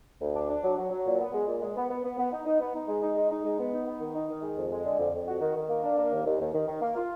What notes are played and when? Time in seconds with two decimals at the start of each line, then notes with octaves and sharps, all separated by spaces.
0.21 D2
0.35 D4
0.50 D4
0.63 F#3
0.78 F#3
0.91 F#3
1.06 A#2
1.20 B3
1.34 G#3
1.48 A#2
1.62 G#3
1.76 B3
1.90 B3
2.04 B3
2.18 B3
2.33 D#4
2.46 D#4
2.60 B3
2.74 D#4
2.88 G#3
3.02 D#4
3.17 G#3
3.31 D#4
3.45 G#3
3.59 B3
3.73 D#4
3.87 B3
4.01 D#3
4.15 D#4
4.29 D#3
4.43 G#3
4.56 F2
4.72 G#3
4.85 D3
4.99 F2
5.14 F2
5.28 F#4
5.41 D#3
5.56 D#3
5.70 A#3
5.83 D4
5.97 A#3
6.12 D#2
6.25 D#2
6.40 D#2
6.54 D#3
6.68 D#3
6.82 A#3
6.96 F4